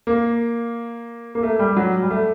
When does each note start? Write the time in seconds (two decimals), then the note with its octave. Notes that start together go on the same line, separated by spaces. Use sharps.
0.07 A#3
1.35 A#3
1.43 A3
1.59 G3
1.77 F#3
2.02 G3
2.10 A3